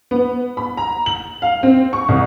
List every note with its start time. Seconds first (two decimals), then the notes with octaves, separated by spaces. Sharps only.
0.11 B3
0.57 B5
0.77 A#5
1.06 F#7
1.42 F5
1.63 C4
1.93 C#6
2.08 C2